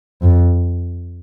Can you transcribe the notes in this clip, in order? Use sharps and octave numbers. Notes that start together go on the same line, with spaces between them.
F2